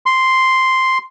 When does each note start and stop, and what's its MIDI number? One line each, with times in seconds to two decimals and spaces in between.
0.06 0.98 84